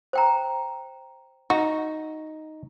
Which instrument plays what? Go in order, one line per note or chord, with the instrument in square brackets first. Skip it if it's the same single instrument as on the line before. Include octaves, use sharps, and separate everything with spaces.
[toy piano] C5 G5 A#5
[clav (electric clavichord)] D#4 [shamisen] F#4